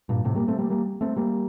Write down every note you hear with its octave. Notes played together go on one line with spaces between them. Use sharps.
G2 A#2
A2 C3
G3 A#3
A3 C4
G3 A#3
G3 A#3
A3 C4
G3 A#3